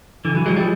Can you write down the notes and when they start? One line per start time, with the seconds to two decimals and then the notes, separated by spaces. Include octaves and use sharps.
0.25 D3 E3
0.35 E3 F#3
0.46 F#3 G#3
0.56 F3 G3